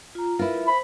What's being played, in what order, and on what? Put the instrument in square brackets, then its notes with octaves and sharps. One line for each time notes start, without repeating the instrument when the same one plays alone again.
[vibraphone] F4 A#5
[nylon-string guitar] E4 F4 [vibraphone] A#4 B4
[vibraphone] C5 [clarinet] B5